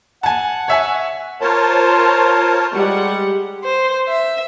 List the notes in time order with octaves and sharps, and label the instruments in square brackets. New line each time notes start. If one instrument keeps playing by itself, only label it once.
[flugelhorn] F#5 [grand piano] G#5 A5
[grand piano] C#5 E5 G#5
[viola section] F4 C5 [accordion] A#4 C#5 A5
[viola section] G3 G#3 F#5
[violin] C5
E5